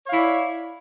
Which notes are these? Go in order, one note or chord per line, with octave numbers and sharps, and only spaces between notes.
E4 C#5 D5 F5